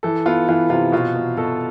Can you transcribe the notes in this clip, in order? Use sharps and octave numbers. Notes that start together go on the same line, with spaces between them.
E3 A4
B3 F4
E3 F4
C3 F4
B2 F4
B2
B2 A4